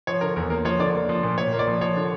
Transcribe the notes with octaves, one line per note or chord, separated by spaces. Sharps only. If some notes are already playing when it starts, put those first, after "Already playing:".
F3 C#5
D3 A#4
E2 A#4
A#3 A#4
F3 C#5
D3 D5
A#3
F3
A#2
A#2 C#5
A#3
D5
F3
F3 C#5
D3